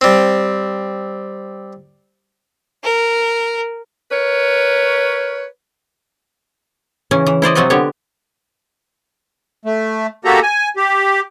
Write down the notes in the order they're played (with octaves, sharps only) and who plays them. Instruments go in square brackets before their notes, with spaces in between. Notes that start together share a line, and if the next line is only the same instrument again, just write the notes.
[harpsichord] G3 C4
[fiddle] A#4
[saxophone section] A#4 B4 C#5
[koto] C#3 E3 C#4
E3
E4 C5 D5 D#5
C3 F#3 C4 F4 F#4 D#5
D3 B3 G4 C#5
[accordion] A3
A#3 F#4 G4 A4 A#5
G#5
G4